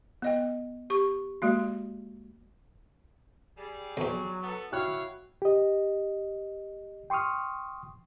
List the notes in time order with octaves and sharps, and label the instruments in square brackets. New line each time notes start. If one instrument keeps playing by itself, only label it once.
[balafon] B3 D#5 G5
G4 C#6
G#3 A#3 F#4
[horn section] G3 G#4
[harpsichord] B1 E2 [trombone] F#3
[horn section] B3 A4
[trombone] E4 [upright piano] F#4 G5 F#6 [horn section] C#5 F5
[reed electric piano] G4 D#5
G5 C6 C#6 D#6 F6